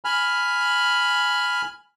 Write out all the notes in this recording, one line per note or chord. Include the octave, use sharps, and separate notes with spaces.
G#5 B5 F6